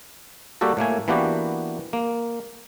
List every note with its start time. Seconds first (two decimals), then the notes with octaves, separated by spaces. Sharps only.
0.61 G3 A#3 F#4 G4 A4
0.77 A2 A3 A#3 G#5
1.08 E3 A#3 B3 D4 F#4 G4
1.93 A#3